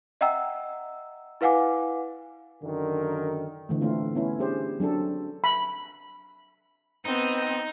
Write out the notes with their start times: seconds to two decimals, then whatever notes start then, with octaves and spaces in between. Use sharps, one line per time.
0.21 D#5 E5 F#5 G5 A#5 E6
1.41 E4 B4 F5 F#5 G#5 D6
2.63 F#2 D3 D#3 A#4
3.69 D3 E3 A3
3.81 A3 C4 F4
4.15 B3 C#4 E4
4.39 C#4 D4 G4 G#4 C5
4.80 F#3 C4 D4 A4
5.44 B5
7.05 B3 C4 D#4